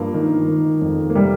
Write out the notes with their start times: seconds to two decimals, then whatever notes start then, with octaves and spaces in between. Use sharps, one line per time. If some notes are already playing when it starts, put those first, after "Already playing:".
Already playing: G2 F3 A#3
0.14 D#3
0.48 D#3
0.81 F2
1.10 A#3
1.15 C3 G3